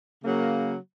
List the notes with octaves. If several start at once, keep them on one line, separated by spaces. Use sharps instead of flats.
C#3 F#3 A#3